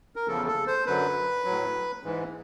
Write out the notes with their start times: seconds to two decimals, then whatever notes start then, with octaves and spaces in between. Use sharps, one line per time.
0.16 A#4
0.28 E2 C#3 F3 A4
0.47 A4
0.67 C5
0.86 F#2 D3 F#3 B4
1.44 A2 F#3
2.03 G#2 E3